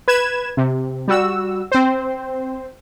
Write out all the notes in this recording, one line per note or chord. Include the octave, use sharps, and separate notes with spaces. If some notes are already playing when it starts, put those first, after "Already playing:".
B4 G#6 E7
C3
G3 F#4 E6
C4 C5